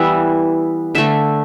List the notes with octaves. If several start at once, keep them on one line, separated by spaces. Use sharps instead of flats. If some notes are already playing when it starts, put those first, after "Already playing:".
Already playing: E3 G3 B3 E5
D3 A3 E5